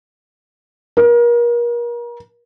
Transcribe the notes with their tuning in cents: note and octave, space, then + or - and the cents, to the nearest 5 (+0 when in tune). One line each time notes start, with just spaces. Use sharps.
A#4 +35